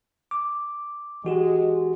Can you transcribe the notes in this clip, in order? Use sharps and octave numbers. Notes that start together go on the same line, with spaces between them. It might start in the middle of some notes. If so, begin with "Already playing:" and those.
D6
E3 G#3 F#4 G4